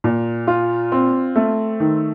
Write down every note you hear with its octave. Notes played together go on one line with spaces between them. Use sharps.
A#2
F4
C4
A3
D#3